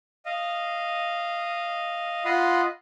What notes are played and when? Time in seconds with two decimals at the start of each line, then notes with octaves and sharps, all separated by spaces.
0.26 D#5 F5
2.25 F4 D#5 F#5 B5 C6